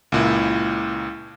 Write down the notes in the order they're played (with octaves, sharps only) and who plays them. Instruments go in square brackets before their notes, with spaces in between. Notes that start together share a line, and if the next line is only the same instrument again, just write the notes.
[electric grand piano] C#2 A#2 E4